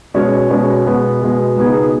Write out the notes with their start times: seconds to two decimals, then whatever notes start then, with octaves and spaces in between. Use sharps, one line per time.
0.14 B2 G#3 C#4
0.50 B2 G#3 C#4
0.86 B2 G#3 B3
1.21 B2 G#3 B3
1.56 C#2 B2 B3 D#4 G#4